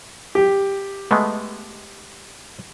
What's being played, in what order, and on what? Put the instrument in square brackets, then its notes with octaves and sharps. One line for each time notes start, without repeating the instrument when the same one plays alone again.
[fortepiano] G4
[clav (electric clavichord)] G#3 A3 B3